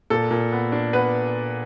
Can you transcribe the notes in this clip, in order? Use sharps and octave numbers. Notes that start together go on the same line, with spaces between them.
A#2 A4
A#2
B3
D4
B3 B4